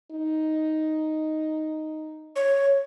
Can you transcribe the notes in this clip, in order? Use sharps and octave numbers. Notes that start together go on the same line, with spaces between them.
D#4
C#5